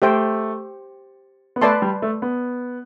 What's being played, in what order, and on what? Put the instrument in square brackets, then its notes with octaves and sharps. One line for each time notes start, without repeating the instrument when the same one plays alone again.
[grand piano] A3 [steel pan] G4 C5 G5
[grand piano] B3
[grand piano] A3 [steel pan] B4 D5 A5 C6
[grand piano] G3
A3
B3